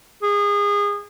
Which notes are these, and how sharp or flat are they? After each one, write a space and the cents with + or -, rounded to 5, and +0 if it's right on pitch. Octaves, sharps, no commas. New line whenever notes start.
G#4 -25